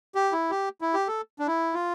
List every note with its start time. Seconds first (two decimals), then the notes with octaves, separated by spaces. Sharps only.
0.15 G4
0.32 E4
0.50 G4
0.81 E4
0.94 G4
1.08 A4
1.39 D4
1.47 E4
1.74 F4